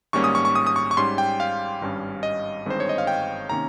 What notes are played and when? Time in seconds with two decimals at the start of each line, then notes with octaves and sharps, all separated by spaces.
0.13 G#1 G#2 G3 A#3 C#4 C#6
0.24 D#6
0.35 C#6
0.45 C#6
0.56 D#6
0.67 D#6
0.76 C#6
0.91 C#6
0.97 G#2 G3 C#4 C6
1.18 G5
1.40 F5
1.81 G#1 G2 G3 C#4
2.23 D#5
2.65 G1 G2 D#3 G#3 C4 C5
2.80 C#5
2.89 D#5
2.98 F5
3.07 G5
3.49 C3 D#3 A#3 C#4 A#5